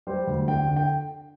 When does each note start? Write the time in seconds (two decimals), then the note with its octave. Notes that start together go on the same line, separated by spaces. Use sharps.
0.07 G3 C5
0.27 D2
0.48 D3 G5
0.67 D3
0.76 G5